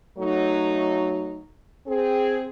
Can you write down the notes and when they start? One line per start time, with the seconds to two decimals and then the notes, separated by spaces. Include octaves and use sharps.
0.18 F#3 A3 D#4
1.87 C4 G#4